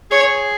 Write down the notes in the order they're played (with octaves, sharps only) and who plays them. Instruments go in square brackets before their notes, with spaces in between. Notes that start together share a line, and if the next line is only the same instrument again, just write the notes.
[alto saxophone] G#4 [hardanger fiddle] C#5